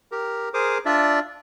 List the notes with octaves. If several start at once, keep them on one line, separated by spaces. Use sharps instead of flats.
G4 A#4
G#4 A#4 C5 D6 D#6
D4 F4 D5 E5